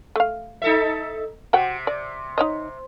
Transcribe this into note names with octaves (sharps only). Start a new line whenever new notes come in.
A3 F5
D#4 A4 E5
C3 F#4 F#5 G5
D5
D#4 C#5 D#5